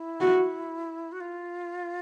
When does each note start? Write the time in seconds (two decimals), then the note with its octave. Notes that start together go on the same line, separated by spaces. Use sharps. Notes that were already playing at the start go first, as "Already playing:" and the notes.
Already playing: E4
0.21 F#4
1.12 F#4
1.20 F4